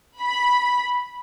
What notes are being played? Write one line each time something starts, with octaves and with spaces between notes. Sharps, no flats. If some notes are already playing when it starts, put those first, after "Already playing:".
B5